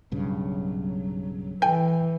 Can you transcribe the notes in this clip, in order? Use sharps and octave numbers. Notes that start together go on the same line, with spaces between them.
B1 G2 C#3 F#3
E3 A4 G5 G#5